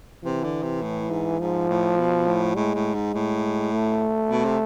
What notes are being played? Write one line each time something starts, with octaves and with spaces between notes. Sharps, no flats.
C3 E3
D3
C3
A2
G#2
G#2 F3
A2
B2
A2
A2 G#3
A2
G#2
A2
A3
B2
C3